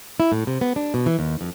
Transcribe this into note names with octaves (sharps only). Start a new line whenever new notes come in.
E4
A2
C3
B3
D4
B2
E3
D#2
F2